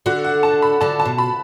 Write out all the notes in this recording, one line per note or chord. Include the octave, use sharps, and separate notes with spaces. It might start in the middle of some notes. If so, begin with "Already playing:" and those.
D3 F#4
F#5
A5
B5
D3 A5
A5
B2
B5